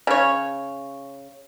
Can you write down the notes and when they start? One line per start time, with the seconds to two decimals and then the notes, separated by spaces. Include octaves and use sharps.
0.07 C#3 C#5